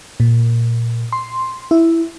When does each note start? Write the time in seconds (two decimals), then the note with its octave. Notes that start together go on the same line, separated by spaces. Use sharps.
0.20 A#2
1.12 C6
1.71 E4